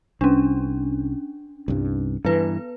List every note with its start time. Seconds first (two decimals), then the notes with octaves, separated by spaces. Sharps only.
0.21 C2 C#4 D4
1.68 C2 G2
2.25 G2 E3 B3 B4